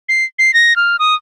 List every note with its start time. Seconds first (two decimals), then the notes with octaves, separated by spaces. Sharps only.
0.09 C7
0.39 C7
0.54 A#6
0.76 F6
0.99 D#6